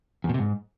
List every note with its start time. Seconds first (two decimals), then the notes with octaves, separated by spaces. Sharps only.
0.24 E2
0.29 B2
0.34 C3
0.39 G#2